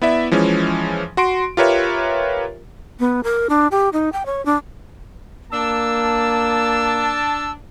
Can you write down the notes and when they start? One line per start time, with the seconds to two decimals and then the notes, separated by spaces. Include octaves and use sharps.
0.02 B3 E4 D5 E5
0.31 E3 F3 G#3 C#4
1.17 F#4 C6 D7
1.57 F4 G4 A#4 B4 C#5 E5
3.00 B3
3.24 A#4
3.50 D4
3.71 G4
3.93 D#4
4.13 G5
4.26 C#5
4.46 D4
5.52 A#3 D4 A5 E6